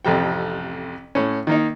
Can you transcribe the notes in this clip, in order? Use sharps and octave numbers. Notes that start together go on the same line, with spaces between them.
A1 F2 C3 G5
A2 C#4
D#3 A#3 D#4